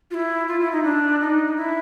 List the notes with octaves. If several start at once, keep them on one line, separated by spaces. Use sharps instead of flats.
F4
E4
F4
E4
D#4
D4
D#4
E4